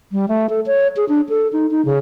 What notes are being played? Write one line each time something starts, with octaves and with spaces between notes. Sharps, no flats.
G3
A3
A4
C#5
G#4
D4
A4
D#4
D#4
C#3